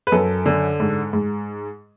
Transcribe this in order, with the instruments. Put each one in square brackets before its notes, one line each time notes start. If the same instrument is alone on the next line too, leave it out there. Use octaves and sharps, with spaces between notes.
[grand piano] B4
F#2 A4
D3
G#2
G#2